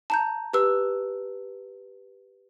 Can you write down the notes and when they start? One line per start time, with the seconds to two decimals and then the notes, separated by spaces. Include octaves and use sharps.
0.10 A5 A#5 G6
0.53 G4 B4 E6